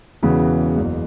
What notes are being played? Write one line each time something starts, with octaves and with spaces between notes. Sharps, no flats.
E1 E2 C#3 E3 B3
F#1 E2 B2